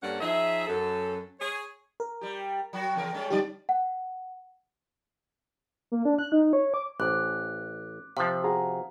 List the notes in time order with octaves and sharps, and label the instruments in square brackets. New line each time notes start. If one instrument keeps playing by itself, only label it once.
[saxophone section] G2 A#3 C#4 A4 D5 F#5
F3 D#4 G#4 E5
F#2 A4
G#4 C#5
[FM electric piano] A#4
[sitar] G3 G4
F#3 F#4
E2 C#3 A#4
G3 G#3 C#4
[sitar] D3 C#4 D5 [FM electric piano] G3 D#4 G4
[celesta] F#5
[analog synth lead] A#3
D4
F#6
D#4
C#5
D6
[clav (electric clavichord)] A1 [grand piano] C5 D6 [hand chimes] F#6
[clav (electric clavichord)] C3 F3 [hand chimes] F5
[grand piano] F#4 G#4 A#5